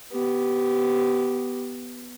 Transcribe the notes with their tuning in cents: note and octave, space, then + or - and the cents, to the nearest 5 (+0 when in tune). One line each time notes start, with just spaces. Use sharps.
B3 +0 G4 -15